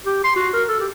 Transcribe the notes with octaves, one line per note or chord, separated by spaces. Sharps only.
G4
C6
F#4
A#4
A4
G4